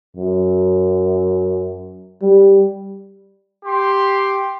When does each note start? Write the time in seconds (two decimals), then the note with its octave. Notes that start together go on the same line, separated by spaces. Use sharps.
0.17 F#2
2.22 G3
3.65 G4 C6